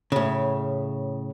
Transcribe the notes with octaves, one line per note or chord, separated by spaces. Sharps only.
A2 C#3